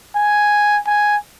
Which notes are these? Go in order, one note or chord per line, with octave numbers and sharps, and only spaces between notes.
G#5
G#5